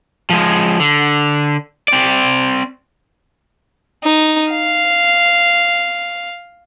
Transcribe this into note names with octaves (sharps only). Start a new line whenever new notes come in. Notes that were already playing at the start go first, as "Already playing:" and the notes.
F3 G#3
D3
C4 D5
D#4
F5